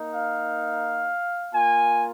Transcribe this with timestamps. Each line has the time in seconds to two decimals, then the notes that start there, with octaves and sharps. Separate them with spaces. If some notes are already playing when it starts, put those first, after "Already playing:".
Already playing: A#3 D#4
0.10 F5
1.54 A#3 F4 G#5